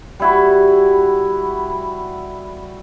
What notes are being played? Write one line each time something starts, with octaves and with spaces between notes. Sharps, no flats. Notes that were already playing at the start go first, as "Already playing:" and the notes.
G3 E4 F#4